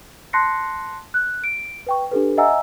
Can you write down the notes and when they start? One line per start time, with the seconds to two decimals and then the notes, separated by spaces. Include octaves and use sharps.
0.33 A5 C6 F#6 A#6 C7 C#7
1.14 F#6
1.44 D7
1.87 B4 G5 C#6
2.11 D4 G4 A4 B4
2.37 D#5 E5 F#5 G#5 A#5 E6